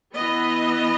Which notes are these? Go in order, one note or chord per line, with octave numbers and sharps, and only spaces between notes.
E3 B3 D#5